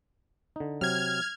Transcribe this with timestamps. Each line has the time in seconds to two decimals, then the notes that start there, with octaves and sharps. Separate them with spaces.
0.56 D3 D#4
0.81 C3 F#3 G4 F6 G#6